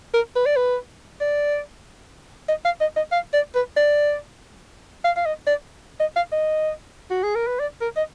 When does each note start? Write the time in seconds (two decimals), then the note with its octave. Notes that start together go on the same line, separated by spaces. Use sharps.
0.14 A#4
0.36 B4
0.46 D5
0.56 B4
1.20 D5
2.49 D#5
2.65 F5
2.81 D#5
2.96 D#5
3.12 F5
3.33 D5
3.55 B4
3.77 D5
5.04 F5
5.17 F5
5.26 D#5
5.47 D5
6.00 D#5
6.16 F5
6.32 D#5
7.11 F#4
7.23 G#4
7.35 A#4
7.47 B4
7.60 D5
7.81 A#4
7.97 D#5